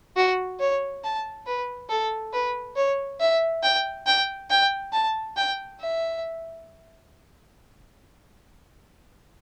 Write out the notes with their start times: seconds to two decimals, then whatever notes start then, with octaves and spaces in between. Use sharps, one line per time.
0.16 F#4
0.60 C#5
1.04 A5
1.47 B4
1.90 A4
2.33 B4
2.76 C#5
3.20 E5
3.63 G5
4.06 G5
4.50 G5
4.93 A5
5.37 G5
5.80 E5